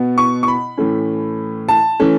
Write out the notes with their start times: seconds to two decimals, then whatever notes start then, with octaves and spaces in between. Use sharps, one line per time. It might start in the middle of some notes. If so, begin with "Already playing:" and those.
Already playing: B2 B3
0.18 C#6
0.43 C#6
0.48 B5
0.77 A2 E3 A3 C#4
1.69 A5
2.00 E3 A3 C#4